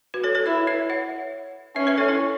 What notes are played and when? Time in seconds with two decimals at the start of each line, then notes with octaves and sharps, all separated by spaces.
0.14 F#4 B4
0.24 A4 C#5
0.35 A4 C#5
0.46 E4 B4 E5
0.67 B4 E5
0.90 C#5 F#5
1.76 C#4 B4 E5
1.87 B4 E5
1.98 A4 C#5
2.08 E4 A4